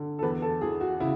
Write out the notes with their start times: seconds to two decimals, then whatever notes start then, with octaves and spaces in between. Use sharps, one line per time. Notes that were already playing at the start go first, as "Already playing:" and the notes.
Already playing: D3
0.19 A4
0.23 E2 B4
0.42 A4
0.61 E3 G#4
0.80 F#4
1.00 C#3 E4